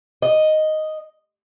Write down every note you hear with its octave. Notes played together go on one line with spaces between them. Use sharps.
D#5